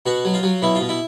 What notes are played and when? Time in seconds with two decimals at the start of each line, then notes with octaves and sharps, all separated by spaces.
0.06 B2 F#4
0.25 F#3
0.34 F4
0.43 F#3
0.62 B2 E4
0.75 F4
0.81 B2
0.89 E4